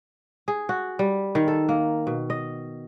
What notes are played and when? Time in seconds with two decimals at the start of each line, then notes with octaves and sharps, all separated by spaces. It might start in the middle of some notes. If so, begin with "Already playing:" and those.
0.48 G#4
0.69 F#4
0.99 G3
1.35 D#3
1.48 A4
1.69 A#3
2.07 B2
2.30 D#5